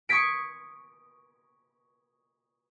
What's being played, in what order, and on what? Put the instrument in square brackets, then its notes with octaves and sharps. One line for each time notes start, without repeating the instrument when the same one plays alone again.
[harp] C#6 D#6 G#6 B6 D7